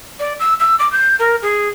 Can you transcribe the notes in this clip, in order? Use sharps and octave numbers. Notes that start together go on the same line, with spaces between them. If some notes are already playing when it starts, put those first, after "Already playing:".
D5
E6
E6
D6
G6
A#4
G#4